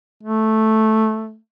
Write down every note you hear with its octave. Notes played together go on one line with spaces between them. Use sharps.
A3